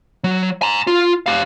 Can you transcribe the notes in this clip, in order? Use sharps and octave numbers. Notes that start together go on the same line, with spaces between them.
F#3
G#5 A#5
F4
G4 F5